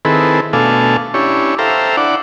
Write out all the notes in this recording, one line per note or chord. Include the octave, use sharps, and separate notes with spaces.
D#3 C4 E4 G#4 A4 B4
B2 A3 D4 A4 F5 G#5
C#4 D4 E4 G4 C#5
A4 C5 E5 F5 G5 A#5
D4 E4 D5 F#5